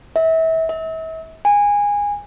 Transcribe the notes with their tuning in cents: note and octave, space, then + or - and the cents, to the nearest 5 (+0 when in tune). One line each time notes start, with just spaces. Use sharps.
E5 -30
E5 -40
G#5 -20